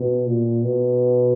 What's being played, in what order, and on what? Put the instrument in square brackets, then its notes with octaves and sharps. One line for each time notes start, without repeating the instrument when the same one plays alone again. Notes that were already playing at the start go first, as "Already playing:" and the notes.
Already playing: [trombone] B2
A#2
B2